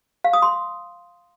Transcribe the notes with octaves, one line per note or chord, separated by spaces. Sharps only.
F5
D#6
C6